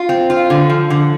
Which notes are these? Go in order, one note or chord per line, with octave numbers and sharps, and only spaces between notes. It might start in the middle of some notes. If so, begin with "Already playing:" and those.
Already playing: F4
C4
F4
D3
F3
D3